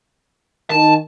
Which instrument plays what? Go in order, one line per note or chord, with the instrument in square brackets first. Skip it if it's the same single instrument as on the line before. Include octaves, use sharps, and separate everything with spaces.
[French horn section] D#3 [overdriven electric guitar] A5